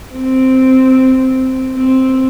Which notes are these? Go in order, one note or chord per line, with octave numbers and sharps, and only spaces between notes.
C4
C4